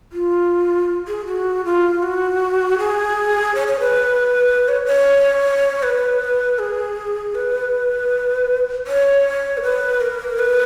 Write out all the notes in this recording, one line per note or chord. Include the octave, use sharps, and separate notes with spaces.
F4
G#4
F#4
F4
F#4
G#4
C#5
C#5
B4
C#5
C#5
B4
G#4
B4
C#5
A#4
B4
A#4
B4